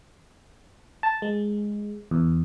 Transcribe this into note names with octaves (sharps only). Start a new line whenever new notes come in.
A5
G#3
E2